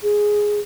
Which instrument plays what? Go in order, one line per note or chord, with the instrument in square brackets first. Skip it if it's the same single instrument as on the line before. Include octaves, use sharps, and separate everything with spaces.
[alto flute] G#4